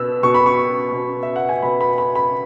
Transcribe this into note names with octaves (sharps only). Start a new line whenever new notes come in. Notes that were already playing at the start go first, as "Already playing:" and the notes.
Already playing: B2 B3 E6
B2 B3 C#6
B5
C#6
B2 B3
E5
F#5
G#5
B2 B3 B5
B5
B5
B5